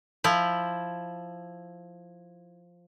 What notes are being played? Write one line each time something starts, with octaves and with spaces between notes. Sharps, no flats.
F3 E4